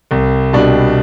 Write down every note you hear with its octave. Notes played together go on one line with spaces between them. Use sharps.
C2
B2 G3 D4